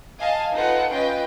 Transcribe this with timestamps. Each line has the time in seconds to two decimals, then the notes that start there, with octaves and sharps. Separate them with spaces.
0.19 D#5 F5 G#5 A5
0.53 D#4 F4 A4 B4 F#5
0.90 C#4 F4 B4 D#5 G5